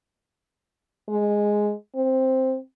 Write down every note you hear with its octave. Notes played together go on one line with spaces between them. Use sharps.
G#3
C4